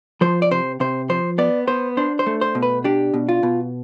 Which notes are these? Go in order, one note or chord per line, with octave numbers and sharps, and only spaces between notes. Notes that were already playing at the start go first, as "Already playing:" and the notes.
F3 C5
D5
C3 C5
C3 C5
F3 C5
B3 D5
B3 C5
D4 C5
C5
A3
C5
B2
B4
D4 G4
B2
F4
B2